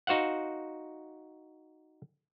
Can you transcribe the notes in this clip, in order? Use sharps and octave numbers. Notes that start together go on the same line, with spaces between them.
D#4 F#4 C5 F5 F#5